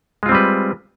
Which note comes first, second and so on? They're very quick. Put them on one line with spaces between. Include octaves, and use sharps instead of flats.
G#3 F4 C4 G3 B4